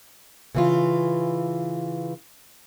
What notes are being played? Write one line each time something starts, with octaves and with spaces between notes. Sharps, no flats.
C#3 E3 F4